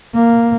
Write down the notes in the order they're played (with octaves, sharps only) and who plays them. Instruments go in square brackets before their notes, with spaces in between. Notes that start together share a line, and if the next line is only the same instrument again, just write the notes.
[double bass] A#3